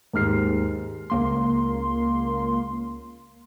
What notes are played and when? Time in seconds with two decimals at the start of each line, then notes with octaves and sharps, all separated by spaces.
0.13 D#2 G#2 F6 C7
1.10 C#2 A#3 C6